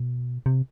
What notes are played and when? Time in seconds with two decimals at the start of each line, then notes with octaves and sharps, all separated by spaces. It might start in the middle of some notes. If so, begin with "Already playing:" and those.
Already playing: B2
0.46 C3